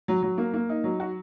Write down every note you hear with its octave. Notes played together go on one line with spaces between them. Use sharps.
F#3
F#3
A#3
A#3
D#4
F#3
F#4